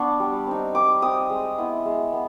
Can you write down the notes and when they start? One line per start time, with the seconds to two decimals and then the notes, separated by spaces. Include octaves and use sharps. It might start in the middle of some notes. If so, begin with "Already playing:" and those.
Already playing: B3 D4 C#6
0.20 G3
0.47 C4 D#4
0.75 G3 D6
1.02 C4 D#4 D#6
1.30 G#3
1.58 B3 E4
1.86 G#3
2.13 B3